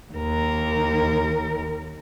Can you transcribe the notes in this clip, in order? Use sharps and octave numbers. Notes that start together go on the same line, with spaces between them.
D#2 A#4